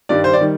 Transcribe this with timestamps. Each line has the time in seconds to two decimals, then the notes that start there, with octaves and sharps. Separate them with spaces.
0.09 G2 D#3 G3 D5
0.24 C5
0.33 D5
0.40 D#3 G3